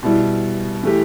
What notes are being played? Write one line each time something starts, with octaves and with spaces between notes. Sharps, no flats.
B2 G3 E4
E3 A3 G4